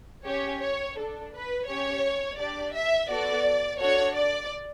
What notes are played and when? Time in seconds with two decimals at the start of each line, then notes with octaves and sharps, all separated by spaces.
0.25 C#4 G4 C#5
0.60 C#5
0.97 D4 A4
1.32 B4
1.67 C#4 G4 C#5
2.37 D4 G4 D5
2.73 E5
3.09 B3 F#4 A4 D5
3.79 D4 F#4 A4 C#5
4.16 D5